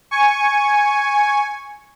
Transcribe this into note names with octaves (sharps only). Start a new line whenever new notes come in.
G#5 C#6